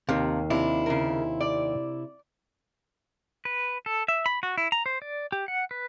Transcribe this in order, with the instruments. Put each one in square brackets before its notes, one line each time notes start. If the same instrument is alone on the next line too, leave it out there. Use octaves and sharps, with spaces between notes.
[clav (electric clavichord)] D#2 F5 [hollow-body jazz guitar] C3
[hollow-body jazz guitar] C3 D4 E4
[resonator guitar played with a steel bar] C#3 A#4
D5
[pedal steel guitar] B4
A4
E5
B5
F#4
E4
A#5
C5
D5
G4
F#5
B4